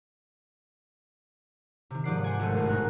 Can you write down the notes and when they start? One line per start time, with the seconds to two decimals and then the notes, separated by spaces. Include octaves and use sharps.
1.90 C3 D#3
2.04 G#2 F3 D5 F#5 C7
2.24 C5 F#5 G#5
2.39 G#1 A3 D#7
2.55 E1 A1 A2
2.69 B2 D#4 A#4 F#6